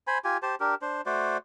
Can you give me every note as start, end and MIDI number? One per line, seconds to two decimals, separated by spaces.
0.07 0.18 72
0.07 0.18 80
0.07 0.18 83
0.24 0.37 65
0.24 0.37 67
0.24 0.37 80
0.42 0.55 67
0.42 0.55 72
0.42 0.55 81
0.60 0.75 62
0.60 0.75 67
0.60 0.75 70
0.82 1.01 62
0.82 1.01 72
1.06 1.37 57
1.06 1.37 66
1.06 1.37 72
1.06 1.37 74